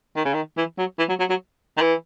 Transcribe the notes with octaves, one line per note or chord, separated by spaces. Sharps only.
D#3
C#3
D#3
E3
F#3
E3
F#3
F#3
F#3
D#3
E3